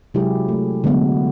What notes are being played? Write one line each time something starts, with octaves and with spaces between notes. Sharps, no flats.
C3 F#3 G#3 E4 G4 G#4
A3
D3 F#3 G#3 A3 B3